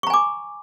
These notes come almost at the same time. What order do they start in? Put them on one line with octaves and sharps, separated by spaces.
C#6 A#5 G#5 D6